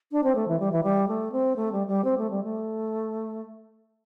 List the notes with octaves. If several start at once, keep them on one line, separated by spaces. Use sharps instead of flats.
D4
C4
A3
E3
G3
E3
G3
A3
C4
A3
G3
G3
C4
A3
G3
A3